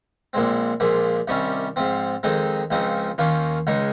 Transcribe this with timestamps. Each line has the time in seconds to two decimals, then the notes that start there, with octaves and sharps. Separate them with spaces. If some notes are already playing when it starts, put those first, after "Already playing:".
0.33 A#1 A#2 G#3 C4
0.80 A#1 A#2 F3 G#3
1.28 C2 C3 D#3 G3 C#4
1.76 G#2 F3 C4
2.23 F2 D#3 G#3 C4 D#4
2.70 C#2 C#3 F3 C4 D#4
3.18 D#2 D#3 A#3 C#4 F4
3.67 C#2 C#3 G#3 D#4